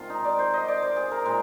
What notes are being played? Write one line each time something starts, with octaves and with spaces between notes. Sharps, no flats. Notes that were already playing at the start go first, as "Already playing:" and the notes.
Already playing: C3 D#3 G#3 F4
D#4
D5
C5
D#5
D5
C5
G#4
A#4
A#2 G#3 C5